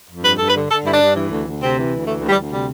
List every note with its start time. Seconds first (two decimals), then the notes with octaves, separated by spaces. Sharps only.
0.08 F2
0.23 G2 B4
0.37 G2 A4
0.46 B4
0.54 D3
0.69 D3 A4
0.85 G2 E4
0.92 D4
1.00 G2
1.15 E3
1.30 D2
1.46 D2
1.61 C3 C4
1.76 E3
1.91 D2
2.05 E3 A3
2.21 D2
2.29 G3
2.36 D2
2.51 C3 G3